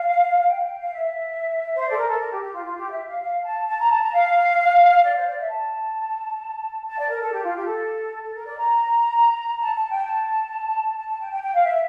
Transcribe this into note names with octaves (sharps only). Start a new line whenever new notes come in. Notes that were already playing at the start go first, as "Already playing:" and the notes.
Already playing: F5
F5
G5
G5
F5
E5
C5
D5
A4
A#4
A4
A#4
G4
G4
F4
F4
G4
E5
F5
F5
A5
A5
A#5
A5
A#5
F5
D5
C5
D5
E5
A5
A5
D5
A#4
A4
G4
F4
G4
A4
A4
A#4
D5
A#5
A5
A5
G5
A5
A5
A5
G5
G5
G5
F5
E5